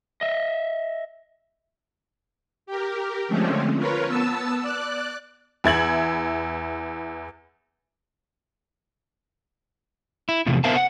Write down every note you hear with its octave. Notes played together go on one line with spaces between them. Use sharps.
D#5 E5
G4 A#4
D3 F3 G#3 A3 C4 C#4
F4 A#4 B4 C#5
B3 A5 E6
D5 F#6
E2 E4 G#6 F#7
E4
E2 A2 C3 F3
B3 A#4 C5 E5 F5 A5
F#5